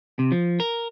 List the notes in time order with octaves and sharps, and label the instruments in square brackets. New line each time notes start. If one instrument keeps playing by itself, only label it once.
[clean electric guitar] C3
F3
A#4